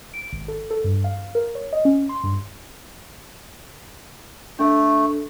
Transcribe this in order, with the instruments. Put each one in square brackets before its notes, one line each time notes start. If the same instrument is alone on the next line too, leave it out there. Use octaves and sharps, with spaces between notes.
[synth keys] D7
G#1
A4
A4
G2
F5
A#4
C#5
D#5
C#4
C6
G2
[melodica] A3 [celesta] D4 A4 E5